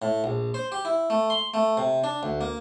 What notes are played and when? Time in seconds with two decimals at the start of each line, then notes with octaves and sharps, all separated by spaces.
0.02 A2
0.24 A#1
0.54 C5
0.72 G4
0.85 E4
1.10 A3
1.30 C6
1.54 A3
1.77 C3
2.04 D4
2.23 D2
2.41 A#3